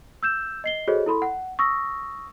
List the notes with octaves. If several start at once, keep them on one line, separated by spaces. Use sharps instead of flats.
E6 G6 E7
D#5 C7 G7
F#4 G#4 A4 C5 C#5 D#5
E4 A4 B5 C6
F#5
C#6 D#6 E6 A#6